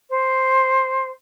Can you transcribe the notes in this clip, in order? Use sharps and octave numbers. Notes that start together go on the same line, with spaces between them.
C5